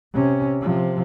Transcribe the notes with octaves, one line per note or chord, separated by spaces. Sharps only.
C3 C#4
C3 F3